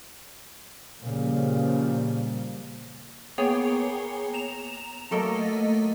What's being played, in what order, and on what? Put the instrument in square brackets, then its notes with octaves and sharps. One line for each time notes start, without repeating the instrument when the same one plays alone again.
[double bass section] A#2 C#3 F3 G3 A#3
[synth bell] A#3 B3 G#4 C#5 G5 G#5
A#5 E7 F7
F#3 A3 A#3 A4 A#4 D#5